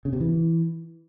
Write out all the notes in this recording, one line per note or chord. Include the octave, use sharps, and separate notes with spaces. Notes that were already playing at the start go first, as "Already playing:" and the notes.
C#3
C3
E3